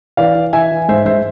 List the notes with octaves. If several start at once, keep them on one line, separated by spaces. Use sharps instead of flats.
E3 D5 F5
E3
E3 E5 G#5
E3
G#2 C5 E5
G#2 C5 E5